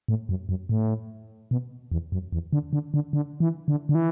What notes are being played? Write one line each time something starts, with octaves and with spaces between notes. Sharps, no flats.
A2
F#2
F#2
A2
B2
E2
F#2
E2
D3
D3
D3
D3
E3
D3
D3
E3